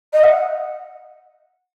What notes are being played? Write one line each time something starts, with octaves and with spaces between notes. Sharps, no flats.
D#5
F#5